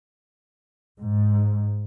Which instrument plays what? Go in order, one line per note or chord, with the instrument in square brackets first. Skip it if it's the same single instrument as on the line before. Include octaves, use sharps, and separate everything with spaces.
[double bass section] G#2